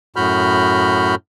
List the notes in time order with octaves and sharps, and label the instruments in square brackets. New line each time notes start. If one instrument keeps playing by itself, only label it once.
[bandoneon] F#2 A2 F#4 B5 F6 G6